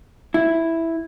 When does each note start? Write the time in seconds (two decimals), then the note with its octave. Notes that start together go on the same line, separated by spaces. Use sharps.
0.34 E4